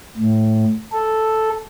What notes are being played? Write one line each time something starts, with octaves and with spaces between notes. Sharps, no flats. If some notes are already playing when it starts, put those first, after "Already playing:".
A2
A4